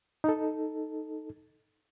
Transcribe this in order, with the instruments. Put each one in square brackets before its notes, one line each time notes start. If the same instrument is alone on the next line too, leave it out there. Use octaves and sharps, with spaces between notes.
[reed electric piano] D#4 A4